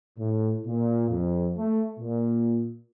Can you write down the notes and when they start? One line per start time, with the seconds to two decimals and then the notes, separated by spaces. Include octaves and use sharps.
0.18 A2
0.66 A#2
1.09 F2
1.56 A3
1.99 A#2